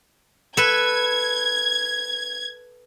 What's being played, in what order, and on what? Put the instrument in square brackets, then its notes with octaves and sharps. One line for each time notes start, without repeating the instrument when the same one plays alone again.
[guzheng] A4 B4 [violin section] G#6